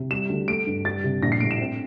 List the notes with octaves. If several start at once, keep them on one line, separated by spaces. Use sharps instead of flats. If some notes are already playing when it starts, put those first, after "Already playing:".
Already playing: C3
G3 E7
D2
A3 D7
G2
G3 A6
C3
A#1 A#6
C7
A2 D7
E7
C4